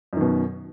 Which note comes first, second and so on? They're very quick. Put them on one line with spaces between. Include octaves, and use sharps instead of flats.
F#2 D#3 B2